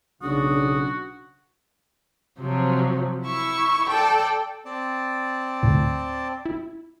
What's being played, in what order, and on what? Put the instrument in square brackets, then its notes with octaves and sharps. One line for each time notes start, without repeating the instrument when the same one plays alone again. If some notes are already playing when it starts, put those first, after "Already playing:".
[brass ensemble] B1 C#3 [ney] D4 [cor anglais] F#4 [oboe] D#6
[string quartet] C3 F3 F#3
E4 C#6 E6
A4 D5 G5 A5
[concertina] C4 D5 A5
[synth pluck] D2 A2
E4